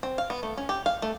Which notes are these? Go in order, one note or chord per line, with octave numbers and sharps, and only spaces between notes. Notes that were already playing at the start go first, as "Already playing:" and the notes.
C4
F5
B3
A3
C#4
G4
F5
A3